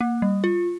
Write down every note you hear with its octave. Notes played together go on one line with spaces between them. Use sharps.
A#3
G3
F4